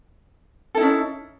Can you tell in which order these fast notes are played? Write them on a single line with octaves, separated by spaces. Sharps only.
A4 E4 D#4 C#4